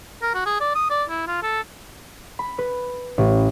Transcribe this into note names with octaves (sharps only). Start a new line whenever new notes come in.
A#4
F#4
G#4
D5
D#6
D5
E4
F4
A4
B5
B4
A1